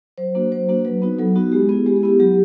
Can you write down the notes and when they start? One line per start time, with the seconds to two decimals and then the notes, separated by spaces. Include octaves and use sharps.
0.18 F#3 C5
0.35 A#3 D4 F#4
0.52 F#3 C5
0.69 A#3 D4 F#4
0.85 F#3 B4
1.02 B3 D#4 F#4
1.19 F#3 A4
1.36 B3 D#4 F#4
1.52 G#3 G4
1.69 B3 E4 G#4
1.86 G#3 G4
1.96 G#4
2.03 B3 E4 G4
2.19 F#3 G4